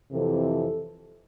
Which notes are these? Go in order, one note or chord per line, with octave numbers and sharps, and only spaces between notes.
F2 C3 E3 A4